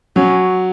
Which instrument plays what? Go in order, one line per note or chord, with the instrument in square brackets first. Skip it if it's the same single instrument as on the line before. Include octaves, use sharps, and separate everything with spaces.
[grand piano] F#3 [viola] C#4